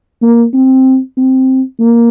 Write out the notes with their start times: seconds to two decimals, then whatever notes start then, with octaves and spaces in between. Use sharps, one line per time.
0.22 A#3
0.54 C4
1.17 C4
1.80 A#3